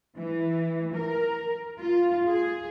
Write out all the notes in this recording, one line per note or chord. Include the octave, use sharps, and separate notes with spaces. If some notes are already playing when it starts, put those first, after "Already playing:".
E3
A#4
F4
G#4